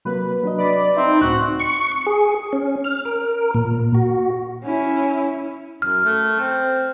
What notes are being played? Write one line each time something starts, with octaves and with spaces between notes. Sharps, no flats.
C3 F#3 A#3 B4
F#3 D4 D#5
B4 D5
C4 D#4 E5
C#2 A2 C4 F#4 F#6
C#6
G#4
C#4
F6
A#4
A#2
F#4
C#4 E4
F#2 F6
A3
C4